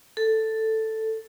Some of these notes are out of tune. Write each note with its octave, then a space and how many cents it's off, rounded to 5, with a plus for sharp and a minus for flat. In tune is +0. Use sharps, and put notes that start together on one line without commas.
A4 +5